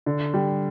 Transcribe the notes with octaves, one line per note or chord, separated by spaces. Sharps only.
D3
G3